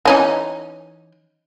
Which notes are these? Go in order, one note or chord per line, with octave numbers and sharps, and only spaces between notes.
E3 C#4 D#4